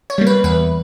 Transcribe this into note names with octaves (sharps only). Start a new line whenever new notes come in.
C#5
G3 A#3
B4
E2 B4